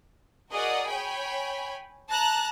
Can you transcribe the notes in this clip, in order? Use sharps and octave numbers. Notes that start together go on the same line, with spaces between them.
F#4 G#4 A#4 D5 D#5 F#5
C#5 G5 G#5 B5
A5 A#5 F#6